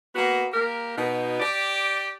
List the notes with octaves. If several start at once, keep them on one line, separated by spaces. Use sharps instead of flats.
A#3 B3 F#4
A#3 G4 A#4
B2 D#4
G4 D5